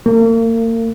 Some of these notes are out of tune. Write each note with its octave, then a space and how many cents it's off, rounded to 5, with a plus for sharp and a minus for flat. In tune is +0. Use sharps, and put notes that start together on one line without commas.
A#3 -40